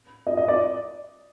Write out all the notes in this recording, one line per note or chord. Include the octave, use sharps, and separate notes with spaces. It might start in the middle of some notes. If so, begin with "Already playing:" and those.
D#5
D#5
D5